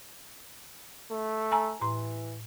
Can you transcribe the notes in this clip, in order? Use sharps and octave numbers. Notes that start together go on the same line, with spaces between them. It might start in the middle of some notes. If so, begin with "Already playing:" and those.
A3
G#5 A#5 E6
A2 E3 C6